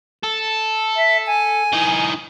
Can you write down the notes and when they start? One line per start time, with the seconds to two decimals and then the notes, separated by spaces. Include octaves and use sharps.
0.23 A4
0.96 E5
1.27 G#5
1.72 E3 D#4